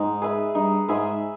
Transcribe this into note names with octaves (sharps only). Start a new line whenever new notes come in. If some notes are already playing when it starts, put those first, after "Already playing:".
Already playing: G#2 D#4
G#4 B4 E5
G2 D#4
G#2 G#4 B4 E5